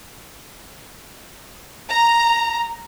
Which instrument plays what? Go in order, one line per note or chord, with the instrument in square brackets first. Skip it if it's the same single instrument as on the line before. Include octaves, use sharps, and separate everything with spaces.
[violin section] A#5